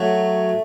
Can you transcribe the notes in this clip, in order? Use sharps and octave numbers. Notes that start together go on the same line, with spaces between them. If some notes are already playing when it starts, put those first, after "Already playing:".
Already playing: F#3 A3